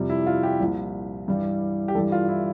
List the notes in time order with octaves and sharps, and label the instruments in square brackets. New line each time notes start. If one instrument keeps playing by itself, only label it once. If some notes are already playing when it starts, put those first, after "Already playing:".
Already playing: [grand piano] F2 C3 G3
E4
F4
G4
C2 A#2 F3
G2 E3 G3
G4
G2 E3 G3 A4
F4
E4